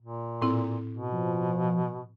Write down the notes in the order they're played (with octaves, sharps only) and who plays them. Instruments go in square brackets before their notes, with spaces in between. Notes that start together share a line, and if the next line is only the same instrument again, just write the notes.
[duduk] A#2
[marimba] A2 C4 E4
[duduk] B2
[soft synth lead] F3